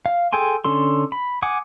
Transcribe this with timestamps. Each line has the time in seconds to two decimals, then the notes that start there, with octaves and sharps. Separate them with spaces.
0.06 F5
0.33 G#4 A4 G5 G#5 C6
0.64 D3 C#4 A4 C6
1.12 B5
1.42 F#5 G#5 D6 D#6